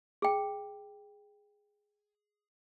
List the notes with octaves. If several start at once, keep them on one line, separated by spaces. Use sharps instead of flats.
G#4 G5